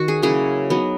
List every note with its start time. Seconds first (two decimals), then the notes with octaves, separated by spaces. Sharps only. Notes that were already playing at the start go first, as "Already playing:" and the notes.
Already playing: D#3 F#4
0.08 G#4
0.22 C#3 F#3 A#3 E4 G#4
0.70 F#3 B3 D#4